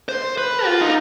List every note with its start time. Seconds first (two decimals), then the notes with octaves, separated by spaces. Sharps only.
0.09 C5
0.38 B4
0.65 F4
0.82 D#4